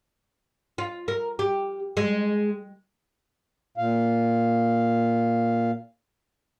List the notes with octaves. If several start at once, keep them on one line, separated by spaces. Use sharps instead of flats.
F4
A#4
G4
G#3
A#2 F5